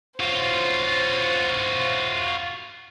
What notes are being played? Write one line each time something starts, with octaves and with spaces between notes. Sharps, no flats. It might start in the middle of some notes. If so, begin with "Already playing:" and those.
F4 F#4 C5 C#5